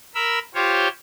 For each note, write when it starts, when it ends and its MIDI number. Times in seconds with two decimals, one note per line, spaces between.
0.15 0.39 70
0.15 0.39 83
0.15 0.39 88
0.55 0.88 65
0.55 0.88 67
0.55 0.88 72
0.55 0.88 73